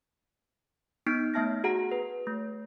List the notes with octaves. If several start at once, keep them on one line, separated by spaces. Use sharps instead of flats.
B3 D#4 G6 B6 D7
A3 B3 E5 A5 F6 A#6
F#4 G#4 F#5 A#5
B4
A3